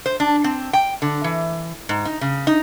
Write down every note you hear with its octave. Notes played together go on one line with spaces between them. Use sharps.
C5
D4
C4
G5
D3
E3
G#2
D#4
C#3
D#4